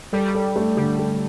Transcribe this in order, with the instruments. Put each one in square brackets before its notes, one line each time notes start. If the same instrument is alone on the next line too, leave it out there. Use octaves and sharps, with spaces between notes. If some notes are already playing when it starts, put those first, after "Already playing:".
[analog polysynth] G3 [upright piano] A4
[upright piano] A4
A3
[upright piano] D3 [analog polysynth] G3
[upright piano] A3